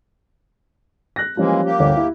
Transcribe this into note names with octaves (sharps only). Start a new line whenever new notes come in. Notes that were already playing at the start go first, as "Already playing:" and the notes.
F#6 A#6
E3 F3 G3 G#3 A#3 C#4
A#3 G4
G1 D2 C#5
E4